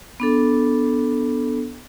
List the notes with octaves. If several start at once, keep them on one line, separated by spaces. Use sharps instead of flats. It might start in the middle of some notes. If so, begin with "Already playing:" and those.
B3 D4 A4